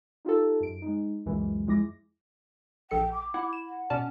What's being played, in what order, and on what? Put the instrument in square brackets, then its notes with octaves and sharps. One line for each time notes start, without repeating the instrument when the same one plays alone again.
[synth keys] D#4 F4 G4 A4
F#2 D7
G#3 D#4
C#2 F#2 A#2 E3 F#3 G#3
F2 F3 G#3 E4 D6 A#6
[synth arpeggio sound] A#1 A4 C#7 [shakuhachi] G5
[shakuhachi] D6
[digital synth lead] E4 [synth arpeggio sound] F#5
[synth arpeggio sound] E7
[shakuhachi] F#5
[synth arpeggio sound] B2 D5 A5 [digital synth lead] C#4